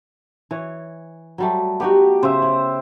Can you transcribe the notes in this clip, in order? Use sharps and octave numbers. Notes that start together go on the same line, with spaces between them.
E3 C#5
F#3 G3 A3
B3 D#4 F#4 G4
C#3 C5 E5
E4